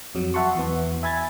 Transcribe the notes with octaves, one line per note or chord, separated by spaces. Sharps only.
F2 F#3
E5 F#5 A5 C6 C#6
E2 E3 B3
E5 G#5 B5 G#6 A6